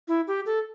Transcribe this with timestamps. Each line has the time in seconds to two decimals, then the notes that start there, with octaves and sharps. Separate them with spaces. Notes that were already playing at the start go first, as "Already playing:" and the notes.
0.08 E4
0.27 G4
0.46 A4